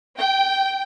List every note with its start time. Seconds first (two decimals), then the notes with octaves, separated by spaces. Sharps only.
0.18 G5